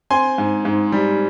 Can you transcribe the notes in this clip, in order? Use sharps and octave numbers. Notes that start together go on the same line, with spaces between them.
C4 G#5 C6
G#2
G#2
G3